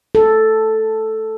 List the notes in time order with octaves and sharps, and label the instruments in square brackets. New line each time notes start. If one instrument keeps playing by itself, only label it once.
[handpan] A4